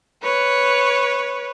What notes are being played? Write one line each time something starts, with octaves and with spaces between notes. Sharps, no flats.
B4 C#5